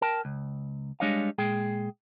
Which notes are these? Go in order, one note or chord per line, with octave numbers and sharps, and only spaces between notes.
A#4 G5 A5
C#2
G3 G#3 D4 C#5 D#5 F5
A#2 G#3 G#4 G5